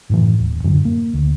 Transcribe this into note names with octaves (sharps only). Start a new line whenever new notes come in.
F#2 A2 E3
D#1
F#2 A2 D3
A#3
D2